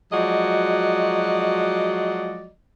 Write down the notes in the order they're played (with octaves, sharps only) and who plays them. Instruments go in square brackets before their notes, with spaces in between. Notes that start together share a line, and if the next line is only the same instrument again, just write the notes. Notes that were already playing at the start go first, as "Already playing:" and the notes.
[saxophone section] F3 F#3 G#3 F#4 D5 D#5